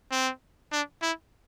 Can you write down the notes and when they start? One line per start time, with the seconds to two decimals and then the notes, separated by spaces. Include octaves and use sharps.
0.11 C4
0.72 D4
1.02 E4